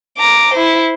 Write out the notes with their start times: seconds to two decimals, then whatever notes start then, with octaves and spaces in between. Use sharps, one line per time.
0.18 A#5 D6
0.54 E4 C5